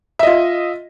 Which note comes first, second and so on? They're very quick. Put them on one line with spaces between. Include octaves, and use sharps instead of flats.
E5 D#5 F4